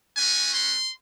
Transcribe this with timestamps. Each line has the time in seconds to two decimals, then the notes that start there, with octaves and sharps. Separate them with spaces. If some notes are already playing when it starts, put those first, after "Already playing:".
0.16 A3 C#4 F#4 G#5
0.53 C6